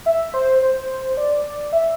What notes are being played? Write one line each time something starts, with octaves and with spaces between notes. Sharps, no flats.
E5
C5
C5
D5
E5